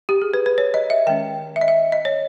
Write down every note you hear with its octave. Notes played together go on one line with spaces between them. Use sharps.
G4
G#4
B4
B4
C#5
D#5
E5
D#3 G#3 C#4 G5
E5
D#5
E5
D#5
C#5